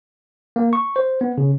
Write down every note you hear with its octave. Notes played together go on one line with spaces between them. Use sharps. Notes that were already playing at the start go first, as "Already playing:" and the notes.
A#3
C#6
C5
B3
C#3